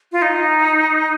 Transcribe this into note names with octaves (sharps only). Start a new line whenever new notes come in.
F4
D#4